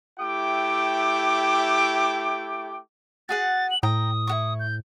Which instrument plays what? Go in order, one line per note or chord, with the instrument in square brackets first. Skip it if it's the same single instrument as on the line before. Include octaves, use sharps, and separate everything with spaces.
[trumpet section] A3 E4 G4 G5 D6
[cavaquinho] F#4 G#4 F#5 [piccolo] A6
[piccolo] F#7
[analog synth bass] A2 [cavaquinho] G5 A#5 [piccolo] D#6
[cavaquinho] E4 F#4 C#6
[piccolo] G6